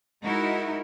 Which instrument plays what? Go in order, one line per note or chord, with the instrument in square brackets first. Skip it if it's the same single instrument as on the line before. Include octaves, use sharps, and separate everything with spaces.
[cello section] G#3 D#4 E4 F#4 A#4